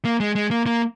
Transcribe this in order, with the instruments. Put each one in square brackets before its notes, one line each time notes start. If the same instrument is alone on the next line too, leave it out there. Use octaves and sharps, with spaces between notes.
[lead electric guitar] A#3
G#3
G#3
A#3
A#3